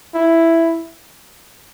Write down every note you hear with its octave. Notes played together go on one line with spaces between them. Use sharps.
E4